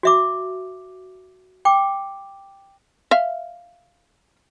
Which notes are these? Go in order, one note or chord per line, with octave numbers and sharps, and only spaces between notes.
F#4 E5 D6
G5 D6
E5 F5